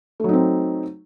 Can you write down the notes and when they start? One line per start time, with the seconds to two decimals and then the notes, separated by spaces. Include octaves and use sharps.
0.20 A3
0.24 F#3
0.29 D#4
0.33 C4